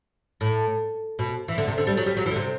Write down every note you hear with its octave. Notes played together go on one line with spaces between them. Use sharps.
A2
B2
E3
D3
C3
D3
G3
F#3
G3
F#3
E3
D3
C3